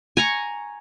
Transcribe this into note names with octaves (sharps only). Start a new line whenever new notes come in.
G#5 A#5 C#6